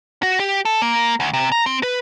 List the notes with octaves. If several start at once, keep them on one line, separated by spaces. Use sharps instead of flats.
F#4
G4
A4
A#3
D2
C3
A#5
C4
B4